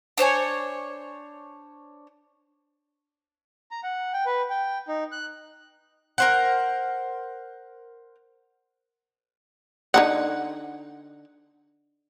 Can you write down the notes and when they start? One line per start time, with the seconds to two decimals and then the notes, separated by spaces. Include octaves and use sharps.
0.18 D4 C5 C#5 G#5
3.71 A#5
3.83 F#5
4.13 G5
4.26 B4
4.50 G5
4.88 D#4
5.12 F#6
6.18 A#4 C5 F#5
9.94 D3 D#4 F#5